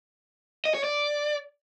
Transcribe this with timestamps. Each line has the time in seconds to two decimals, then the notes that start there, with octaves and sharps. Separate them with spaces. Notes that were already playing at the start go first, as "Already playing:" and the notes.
0.65 D#5
0.75 C#5
0.84 D5